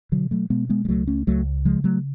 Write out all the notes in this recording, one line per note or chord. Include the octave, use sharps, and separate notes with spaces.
B2 D3 F#3
F#3 A3
B2 G#3 B3
G#3 B3
G#3
C#2 F#3 A3
A3 C#4
C#2 F#3 A3
C#3 F3 G#3
F#3 A3